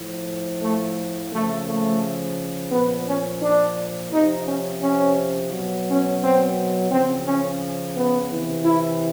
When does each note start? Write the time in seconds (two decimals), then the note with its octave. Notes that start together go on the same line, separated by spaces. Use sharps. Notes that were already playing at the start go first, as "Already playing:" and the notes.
Already playing: A2 F3
0.62 A3
1.33 C#3 F3 A3
1.68 A3
2.72 A#2 F3 B3
3.08 C#4
3.42 D4
4.11 C3 F3 D#4
4.46 C#4
4.81 C#4
5.51 B2 F#3
5.87 C#4
6.21 C4
6.91 C#3 F3 C4
7.26 C#4
7.96 B3
8.31 E3
8.36 C3
8.65 E4